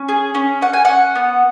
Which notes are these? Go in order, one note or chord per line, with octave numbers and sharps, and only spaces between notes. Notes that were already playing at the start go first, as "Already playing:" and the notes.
Already playing: C#4
G#4
C#4
C#4 F#5
G#5
C#4 F#5
B3